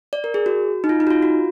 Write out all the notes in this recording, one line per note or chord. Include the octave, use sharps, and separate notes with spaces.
D5
A#4
G#4
F#4
D#4
F4
D#4
F#4
F4
F#4